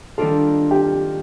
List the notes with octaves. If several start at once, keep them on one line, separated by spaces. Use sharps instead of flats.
D#3 G3 A#3 D4 F4 A4
G4